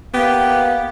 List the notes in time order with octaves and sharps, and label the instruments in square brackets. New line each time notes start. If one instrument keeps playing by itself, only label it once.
[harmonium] A#3 [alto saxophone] B3 [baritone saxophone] G4